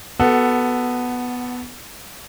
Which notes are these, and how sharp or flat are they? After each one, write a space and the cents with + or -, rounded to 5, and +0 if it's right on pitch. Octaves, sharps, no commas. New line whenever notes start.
B3 +0 F#4 +25 A4 +0